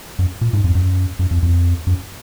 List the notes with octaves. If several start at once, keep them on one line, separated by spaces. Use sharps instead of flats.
F#2
A#2
G#2
F2
F#2
F#2
F2
F2
F#2